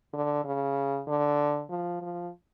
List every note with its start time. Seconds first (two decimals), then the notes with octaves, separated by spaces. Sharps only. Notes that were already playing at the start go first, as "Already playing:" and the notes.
0.13 D3
0.44 C#3
1.07 D3
1.70 F3
2.01 F3